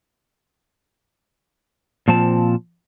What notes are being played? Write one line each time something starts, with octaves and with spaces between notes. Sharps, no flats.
A#2 F3 C4 A5